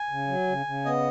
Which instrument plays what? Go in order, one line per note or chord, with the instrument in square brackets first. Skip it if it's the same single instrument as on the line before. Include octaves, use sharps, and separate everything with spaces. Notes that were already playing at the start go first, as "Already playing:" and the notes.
Already playing: [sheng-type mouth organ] G#5
[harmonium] C#3
F#3
C#3
C#3
[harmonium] B3 [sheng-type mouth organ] D#5